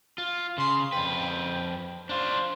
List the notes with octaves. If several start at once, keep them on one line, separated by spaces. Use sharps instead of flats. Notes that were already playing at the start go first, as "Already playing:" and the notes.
F4
C#3 C6
F2 B4 G5
D4 F4 C5